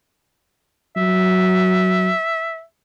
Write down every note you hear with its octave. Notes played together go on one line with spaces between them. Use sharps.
F#3 E5